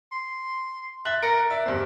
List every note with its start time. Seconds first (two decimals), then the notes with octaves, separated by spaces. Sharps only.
0.12 C6
1.05 E5 F#6 A6 F#7
1.23 A#4 A#6 C#7 D7
1.50 D5 E5
1.66 E2 G2 C5